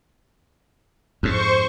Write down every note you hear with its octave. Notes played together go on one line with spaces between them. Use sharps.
F2 G#2 C5 C#6